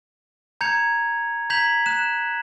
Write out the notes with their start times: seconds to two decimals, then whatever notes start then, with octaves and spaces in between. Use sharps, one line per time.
0.61 A#5 G6 G#6 C#7 F7
1.50 A#5 G6 G#6 B6 F7 F#7
1.86 F#6 E7